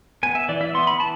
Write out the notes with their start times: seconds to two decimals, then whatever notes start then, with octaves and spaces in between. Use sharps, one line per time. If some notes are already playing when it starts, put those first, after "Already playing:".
0.23 B3 G#5
0.35 E5
0.49 E3 D5
0.61 E5
0.74 B3 C6
0.87 B5
1.00 E3 A5